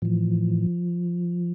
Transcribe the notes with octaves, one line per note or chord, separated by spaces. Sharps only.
A2 E3 F3